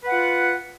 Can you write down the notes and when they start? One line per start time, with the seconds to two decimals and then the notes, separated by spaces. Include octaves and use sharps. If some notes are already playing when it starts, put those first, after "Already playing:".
0.04 B4
0.07 F#5
0.11 F4